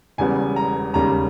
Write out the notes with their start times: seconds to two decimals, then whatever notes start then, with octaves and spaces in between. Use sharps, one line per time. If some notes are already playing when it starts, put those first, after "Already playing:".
0.18 E1 E2 C#3 G3 B3 G#5
0.56 A#5
0.94 E1 D#2 C#3 G3 A#5